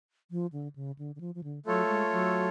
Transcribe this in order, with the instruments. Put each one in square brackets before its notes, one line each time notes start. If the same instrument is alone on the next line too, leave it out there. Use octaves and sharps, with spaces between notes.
[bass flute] F3
D3
C#3
D3
D3
F3
F3
D3
[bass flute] F#3 [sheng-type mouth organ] A3 F4 A4 C#5
[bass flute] G#3
F#3